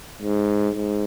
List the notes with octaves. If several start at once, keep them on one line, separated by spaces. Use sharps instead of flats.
G#2
G#2